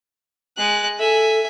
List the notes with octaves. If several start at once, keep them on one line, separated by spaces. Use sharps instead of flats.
G#3 F#6
A4 E5 G#5